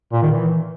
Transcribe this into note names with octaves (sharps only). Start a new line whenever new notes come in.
A#2
D#3
E3